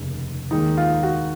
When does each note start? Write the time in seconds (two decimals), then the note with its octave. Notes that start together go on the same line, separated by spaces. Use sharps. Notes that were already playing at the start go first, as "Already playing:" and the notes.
Already playing: F1 D#2 C#3
0.51 D#2 D#3 G#3 D#4
0.77 F4
1.03 F#4